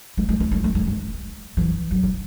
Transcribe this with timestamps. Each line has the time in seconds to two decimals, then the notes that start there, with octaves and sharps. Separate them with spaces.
0.17 G#3
0.29 G#3
0.40 G#3
0.51 A3
0.64 A3
0.75 G#3
0.87 G#3
1.57 E3
1.91 F#3
2.03 E3